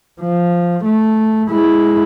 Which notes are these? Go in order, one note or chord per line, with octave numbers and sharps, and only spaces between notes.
F3
A3
G#3 E4